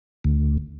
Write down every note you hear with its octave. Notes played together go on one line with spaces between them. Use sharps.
D2